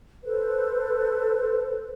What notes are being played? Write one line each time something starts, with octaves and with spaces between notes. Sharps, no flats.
A4 B4 C5